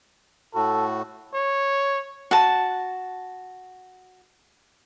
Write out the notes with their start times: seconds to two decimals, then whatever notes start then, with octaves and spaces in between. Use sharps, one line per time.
0.55 A2 F#4 A4
1.34 C#5
2.31 F#4 A5